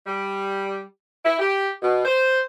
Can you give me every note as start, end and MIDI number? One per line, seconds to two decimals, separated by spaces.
0.05 0.82 55
1.24 1.36 64
1.39 1.69 67
1.82 2.03 47
2.05 2.39 72